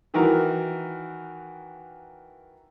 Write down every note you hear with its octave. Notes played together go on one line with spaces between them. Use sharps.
D#3 E3 F#4 A#4